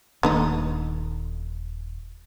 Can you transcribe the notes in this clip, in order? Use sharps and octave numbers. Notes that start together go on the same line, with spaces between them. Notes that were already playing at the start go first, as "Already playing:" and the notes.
D#1 D3 D#3 A3 A#3 D#4